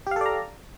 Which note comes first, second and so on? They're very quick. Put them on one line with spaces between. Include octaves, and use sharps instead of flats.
G4 F5 A4 D5 A#5